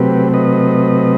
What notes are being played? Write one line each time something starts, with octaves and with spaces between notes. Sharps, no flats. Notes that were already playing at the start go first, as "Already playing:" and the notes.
Already playing: C3 F#3 A3 C4 G4 B4
B4 D#5